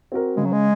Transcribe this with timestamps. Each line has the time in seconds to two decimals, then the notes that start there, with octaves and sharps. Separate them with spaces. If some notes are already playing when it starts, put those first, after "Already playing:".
0.12 C4 F#4 A#4
0.37 C#3 G#3
0.45 F#3
0.52 G#3